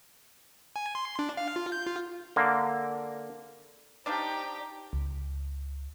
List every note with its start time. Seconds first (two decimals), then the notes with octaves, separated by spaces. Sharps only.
0.76 G#5
0.95 C6
1.19 D4
1.37 F5
1.56 F4
1.72 G6
1.86 F4
2.36 D3 A#3
4.06 F3 D4 D#4 G4 D5
4.93 C#2